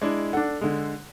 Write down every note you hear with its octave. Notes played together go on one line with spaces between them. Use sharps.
G#3 D4 E4
D4 A4 F#5
D3 G#3